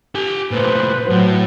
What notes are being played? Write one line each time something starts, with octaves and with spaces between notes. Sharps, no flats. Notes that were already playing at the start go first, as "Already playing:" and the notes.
G4 G#5
A#2 A3 B4 C5
A2 F#3